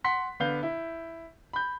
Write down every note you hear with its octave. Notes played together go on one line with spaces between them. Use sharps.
F#5 C6 B6
D3 B3 F5 G6 G7
E4
B5 G6